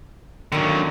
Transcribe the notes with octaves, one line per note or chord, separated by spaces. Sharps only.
D3 D#3 F#3 A#3